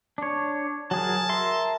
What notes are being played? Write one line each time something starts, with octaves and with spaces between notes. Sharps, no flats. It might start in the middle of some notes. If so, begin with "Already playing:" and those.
D4 C#5
F#3 G#4 A#4 A5
A#4 E5 C6